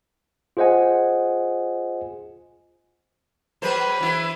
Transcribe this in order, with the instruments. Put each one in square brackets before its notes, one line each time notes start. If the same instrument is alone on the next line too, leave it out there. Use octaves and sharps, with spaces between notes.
[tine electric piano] F4 G#4 C5 D#5 F#5 G#5
[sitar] F#3 G#4 C5 [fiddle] B4
[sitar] E3 E4